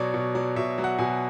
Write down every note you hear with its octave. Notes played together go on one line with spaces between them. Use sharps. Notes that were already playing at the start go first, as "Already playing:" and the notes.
Already playing: B2 F#3 C#5 D5
B2
F#3 D5
B2 E5
F#3
F#5
B2 G#5